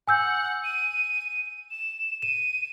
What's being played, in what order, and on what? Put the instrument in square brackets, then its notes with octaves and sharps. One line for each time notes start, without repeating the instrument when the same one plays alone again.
[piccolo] F#5 [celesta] G#5 E6 G6
[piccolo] D#7
E7
[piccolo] D#7 [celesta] E7